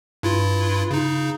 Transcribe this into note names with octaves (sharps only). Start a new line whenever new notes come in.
G2 E4 F4
C#3 D#4